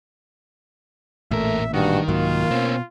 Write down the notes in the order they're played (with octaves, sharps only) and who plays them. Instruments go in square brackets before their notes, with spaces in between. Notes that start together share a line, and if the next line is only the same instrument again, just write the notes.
[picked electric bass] A1 A#2 [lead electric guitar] E2 A#4 [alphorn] A3 [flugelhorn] E5
[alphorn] G2 [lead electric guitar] D#3 [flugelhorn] F#4
[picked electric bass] C2 G#2 F#3 [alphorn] A#3 [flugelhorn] F4
[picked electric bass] B2 [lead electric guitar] C4 C#4